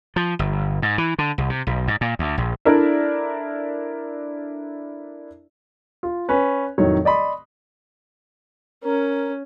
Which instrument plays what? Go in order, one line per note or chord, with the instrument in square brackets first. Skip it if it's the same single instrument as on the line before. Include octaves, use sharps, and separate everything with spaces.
[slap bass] F3
G1
G#2
E3
D3
C2
C3
B1
G#2
A#2
D2
A#1
[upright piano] D4 E4 A4 A#4 D5 E5
[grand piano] F4
C#4 B4 C#5
F1 A2 D#3 F#3 C#5
D5 D#5 B5 C6
[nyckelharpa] C#4 [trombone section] A#4